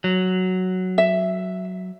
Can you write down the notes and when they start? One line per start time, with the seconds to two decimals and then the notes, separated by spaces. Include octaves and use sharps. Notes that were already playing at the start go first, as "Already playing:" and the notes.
0.04 F#3
0.98 E5